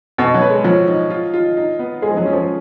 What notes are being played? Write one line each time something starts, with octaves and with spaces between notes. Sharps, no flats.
B2 D#5
F#3
B4
G#3
F3 F#3
D#4
F4
F4
D#4
B3
G#3 G#4
F3
F#3
C#4
F3